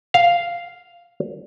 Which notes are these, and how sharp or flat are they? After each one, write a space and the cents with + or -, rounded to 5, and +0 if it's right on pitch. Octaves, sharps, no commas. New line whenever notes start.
F5 -5